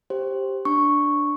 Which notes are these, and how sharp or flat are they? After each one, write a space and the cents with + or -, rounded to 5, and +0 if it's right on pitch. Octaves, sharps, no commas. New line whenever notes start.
G4 +0 C5 +10
D4 +0 C#6 +0